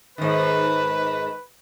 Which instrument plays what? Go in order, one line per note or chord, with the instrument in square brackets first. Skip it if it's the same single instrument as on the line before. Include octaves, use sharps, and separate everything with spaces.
[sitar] G#2 D#3 [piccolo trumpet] B4